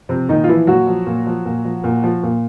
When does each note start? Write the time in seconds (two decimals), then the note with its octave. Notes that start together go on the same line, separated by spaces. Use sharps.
0.09 C3 F3 C4
0.29 A#2 D#3 D#4
0.44 F4
0.48 E3 F3 E4
0.67 A#2 F#3 F#4
0.87 F3
1.06 A#2
1.27 F3
1.45 A#2
1.65 F3
1.84 A#2
2.03 F3
2.23 A#2